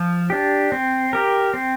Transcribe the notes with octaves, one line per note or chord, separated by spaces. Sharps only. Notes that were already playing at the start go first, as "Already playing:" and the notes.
Already playing: F3
D4 G4
C4
G4 A#4
C4